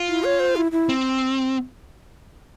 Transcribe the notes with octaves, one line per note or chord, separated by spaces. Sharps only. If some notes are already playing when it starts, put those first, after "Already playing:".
Already playing: F4
E4
C#5
C5
E4
E4
C4